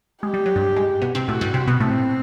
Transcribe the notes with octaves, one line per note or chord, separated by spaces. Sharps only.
G#3 G4
G3
F#3
G2 G3
G#2 G#3
B2 B3
C3 C4
A2 A3 F#4
G2 G3
C3 C4
B2 B3
A2 A3 C4